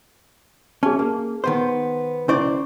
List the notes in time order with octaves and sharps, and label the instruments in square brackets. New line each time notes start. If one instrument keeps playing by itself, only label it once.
[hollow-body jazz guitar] C#4 [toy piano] G#4 A5
[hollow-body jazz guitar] A#3
D#3 B3 C5
[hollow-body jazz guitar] C#2 C5 D5 [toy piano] C#4 E4 C#6